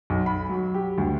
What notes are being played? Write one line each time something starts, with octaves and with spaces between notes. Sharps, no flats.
B1
B5
F#3
G4
D2